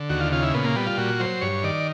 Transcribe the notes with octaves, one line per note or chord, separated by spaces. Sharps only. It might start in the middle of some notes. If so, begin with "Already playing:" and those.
Already playing: D3
D#2 F#4
F4
C#3 F4
E4
A#2 B3
A#3
G3 B3
F4
A#2 F#4
F#3 C5
G2 C#5
D#3 D5